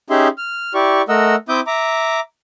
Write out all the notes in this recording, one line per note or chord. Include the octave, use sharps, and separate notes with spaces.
C#4 D#4 G4 G#4 E5 C6
F6
E4 G4 D5 C#6
A3 A#4 D#5 F#5 E6
C4 E4 E5 D6 D#6 G6
E5 A#5 D6